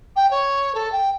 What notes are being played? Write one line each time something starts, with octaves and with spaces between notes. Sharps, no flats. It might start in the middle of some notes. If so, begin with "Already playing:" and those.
G5
C#5
A4
G5